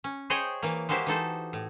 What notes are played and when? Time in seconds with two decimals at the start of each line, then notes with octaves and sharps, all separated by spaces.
0.04 C#4
0.30 G#4 C5 C#5 D#5 G5
0.62 E3 A#3
0.89 G#3 A#3 F#4 G4 C5 E5
1.07 E3 D#4 A4 C5
1.53 A2